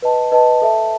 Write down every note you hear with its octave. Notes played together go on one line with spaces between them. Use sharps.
B4 D#5 A5
B4 D#5 A5
A4 E5 A5